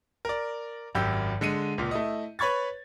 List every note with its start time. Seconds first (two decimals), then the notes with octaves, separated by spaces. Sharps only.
0.25 A#4 D5
0.95 G#1 F#2 G4 E6 G6
1.41 D3 G#3 C#7 D#7
1.78 C#2 A#2
1.91 A3 E4 D#5
2.39 B4 C#5 B5 C#6 G#6 A6